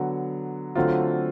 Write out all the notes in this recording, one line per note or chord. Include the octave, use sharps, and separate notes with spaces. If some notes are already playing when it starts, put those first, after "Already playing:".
Already playing: D3 F#3 B3
D3 F#3 A3 C4 F4